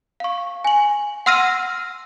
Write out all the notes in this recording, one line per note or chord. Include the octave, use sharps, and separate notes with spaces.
F5 C#6
G#5 F#7
F#5 C6 E6 F6 A#6 D#7